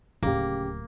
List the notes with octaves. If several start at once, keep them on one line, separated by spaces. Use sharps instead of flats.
D1 D2 C#3 A#3 G4